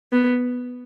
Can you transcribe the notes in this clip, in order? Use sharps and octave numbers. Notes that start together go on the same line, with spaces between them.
B3